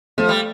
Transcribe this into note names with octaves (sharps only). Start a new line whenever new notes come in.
F3 A3
G3